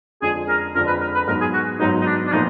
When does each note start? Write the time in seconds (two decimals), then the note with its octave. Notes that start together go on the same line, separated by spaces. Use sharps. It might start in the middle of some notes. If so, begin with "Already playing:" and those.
0.22 F2 D3 G#3 D4 F4 G#4
0.48 A#4
0.74 F2 D3 G#3 D4 F4 A#4
0.87 B4
1.00 A#4
1.15 B4
1.27 G#2 F#3 B3 A#4
1.41 G#4
1.54 F#4
1.79 G#2 F#3 B3 D#4
2.01 D#4
2.06 D4
2.27 D4
2.32 A#2 F3 B3 D#4